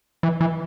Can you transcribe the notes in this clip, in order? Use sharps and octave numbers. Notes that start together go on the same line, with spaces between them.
E3
E3